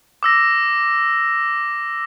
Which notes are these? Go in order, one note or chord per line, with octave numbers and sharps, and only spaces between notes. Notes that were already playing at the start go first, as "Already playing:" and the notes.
D6 E6 A#6